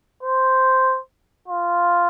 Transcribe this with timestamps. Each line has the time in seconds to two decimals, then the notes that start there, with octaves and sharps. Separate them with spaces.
0.23 C5
1.49 F4